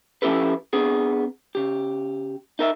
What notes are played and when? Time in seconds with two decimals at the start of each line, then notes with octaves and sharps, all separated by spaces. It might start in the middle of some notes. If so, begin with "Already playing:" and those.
0.22 F3 C#4 E4 G4 A4 B4
0.73 B3 C4 D4 G#4
1.55 C#3 G4
2.59 D#4 A#4 E5